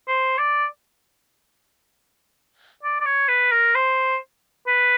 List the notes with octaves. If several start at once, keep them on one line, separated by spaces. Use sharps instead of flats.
C5
D5
D5
D5
C#5
B4
A#4
C5
B4